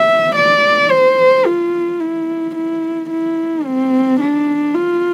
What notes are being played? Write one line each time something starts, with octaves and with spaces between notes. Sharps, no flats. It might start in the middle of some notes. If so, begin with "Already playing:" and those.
Already playing: E5
D5
C5
F4
E4
E4
E4
C4
D4
F4